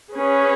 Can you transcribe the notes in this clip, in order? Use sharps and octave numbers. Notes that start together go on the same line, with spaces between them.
C#4 G#4 B4